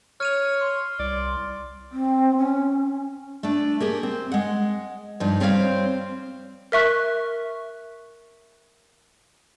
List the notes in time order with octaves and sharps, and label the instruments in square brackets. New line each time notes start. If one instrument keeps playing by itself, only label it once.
[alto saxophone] C#5 [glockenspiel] F6 D#7 F7
[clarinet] C6
[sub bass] C2 [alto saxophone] D5
[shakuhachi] C4
C#4
[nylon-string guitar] A3 D4
A#3 G4 G#4
C4
G#3 F#5
G2 F3 D#4
G3 C4 C5 C#5 D#5 F5
[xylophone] A#4 E5 C#6 F#6